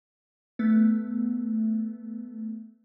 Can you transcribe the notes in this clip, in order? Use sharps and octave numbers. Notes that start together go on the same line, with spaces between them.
A3 B3